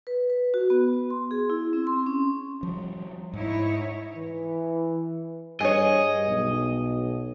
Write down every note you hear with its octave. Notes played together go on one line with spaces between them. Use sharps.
B4
B4
F#4
B3
C6
G#4
E4
C4
C6
C#4
F3 G3
G#2 D#4 E4 C#5
E3
G2 G#4 C#5 D#5
B1